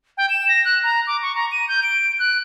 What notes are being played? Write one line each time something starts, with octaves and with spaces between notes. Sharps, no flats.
G5
E7
A#6
F#6
A#5
D6
C#6
A#5
D#7
G6
D7
F#6